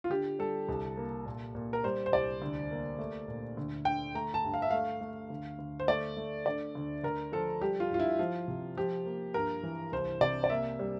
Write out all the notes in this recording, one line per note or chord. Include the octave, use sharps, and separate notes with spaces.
F4
D3 G4
G3 A4
C2
A#3
A#2
A#2
A#4
G3 C5
C5
C2 D5
D2
A#3
A3
A#2
D2
D3 G5
A3 A#5
A5
G2
F5
E5
A3 F5
A3
D2
D2
C5
A3 D5
A3
D3 D5
D2
D2 A#4
F3 A4
G3 G4
F4
G2 F4
E4
F3 F4
C3
F3 G4
A#3
G2 A#4
E3
C2 C5
C3 D5
D5
A#3 E5
G3